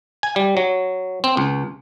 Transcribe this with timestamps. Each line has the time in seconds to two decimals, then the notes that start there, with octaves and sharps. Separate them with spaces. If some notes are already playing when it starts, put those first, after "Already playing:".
0.23 G#5
0.36 G3
0.57 F#3
1.24 C4
1.37 C#2